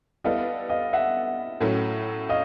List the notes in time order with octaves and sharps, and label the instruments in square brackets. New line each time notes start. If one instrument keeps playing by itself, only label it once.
[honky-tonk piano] G3 B3 E4 A4 [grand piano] D#5 F5
[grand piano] D#5 F5
E5 F#5
[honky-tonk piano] A2 F#3 A3 C#4
[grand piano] D#5 F5